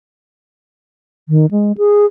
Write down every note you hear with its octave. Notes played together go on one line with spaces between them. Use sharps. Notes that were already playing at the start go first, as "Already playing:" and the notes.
D#3
G#3
G#4